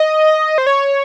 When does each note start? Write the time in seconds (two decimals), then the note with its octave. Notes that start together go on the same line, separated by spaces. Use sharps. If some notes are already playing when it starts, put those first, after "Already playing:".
Already playing: D#5
0.58 C5
0.67 C#5